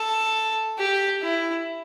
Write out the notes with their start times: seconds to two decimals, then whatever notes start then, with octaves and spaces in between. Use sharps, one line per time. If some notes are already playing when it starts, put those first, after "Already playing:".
Already playing: A4
0.79 G4
1.22 E4